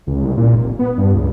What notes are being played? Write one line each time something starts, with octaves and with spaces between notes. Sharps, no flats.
C#2
C2
A#2
F1
B3
G2
C#2